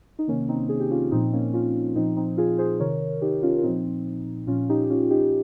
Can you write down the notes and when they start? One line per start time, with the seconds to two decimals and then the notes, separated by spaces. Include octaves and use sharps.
0.19 D#4
0.28 C3 D#3 A#3 C#4
0.49 C4 D#4
0.69 G#4
0.80 G4
0.91 C#4 F4
1.12 A#2 F3 C4 D#4
1.32 A#3 C#4
1.54 C#4 F4
1.95 A#2 F3 C4 D#4
2.17 C4 D#4
2.37 F4 G#4
2.58 G#4 C5
2.80 C3 D#3 A#4 C#5
3.22 D#4 G4
3.43 C#4 F4
3.58 F4
3.63 A#2 F3 C4 D#4
4.47 A#2 F3 C#4 F4
4.69 D#4 G4
4.84 D#4
4.90 C#4 F4
5.10 D#4 G4